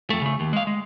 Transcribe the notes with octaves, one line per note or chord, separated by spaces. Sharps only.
F2 A3
C#3 A3
D#2
G#3 F5
G#3